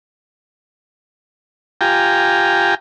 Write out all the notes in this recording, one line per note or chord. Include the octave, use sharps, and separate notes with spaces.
F4 G4 G5 G#5 A#5